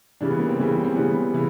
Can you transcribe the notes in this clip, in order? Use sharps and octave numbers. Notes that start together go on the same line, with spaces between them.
C#3 E3 G3 D4
B3
A#3
C4
C#3 E3 G3
C4
C4
C#3 E3 G3 B3
C#3 E3